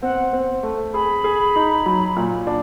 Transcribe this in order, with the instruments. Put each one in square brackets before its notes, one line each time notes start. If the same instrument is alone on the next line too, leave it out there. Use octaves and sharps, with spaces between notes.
[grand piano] C4 [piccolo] F#5
[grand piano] C4
A3
[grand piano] G#4 [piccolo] B5
[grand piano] G#4
D#4
F#3
A#2
D4